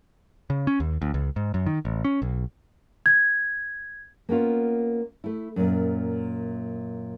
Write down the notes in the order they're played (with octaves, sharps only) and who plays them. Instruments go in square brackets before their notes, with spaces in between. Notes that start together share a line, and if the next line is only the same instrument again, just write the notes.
[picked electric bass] C#3
C#4
D#2
D2
C#2
G#2
F#2
D#3
A1
C#4
B1
[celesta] G#6
[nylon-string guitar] A#3 B3 C#4 F4
A3 E4
F#2 A#2